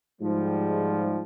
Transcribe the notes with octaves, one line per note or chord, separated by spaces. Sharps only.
G#2 F3 G3